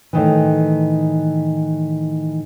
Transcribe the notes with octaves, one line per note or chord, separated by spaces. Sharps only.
A2 D#3 E3